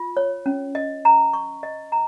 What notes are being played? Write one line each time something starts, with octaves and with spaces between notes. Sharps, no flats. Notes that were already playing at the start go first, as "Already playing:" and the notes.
Already playing: F4
C#5
C#4
D#5
A#5
C#6
D#5
A#5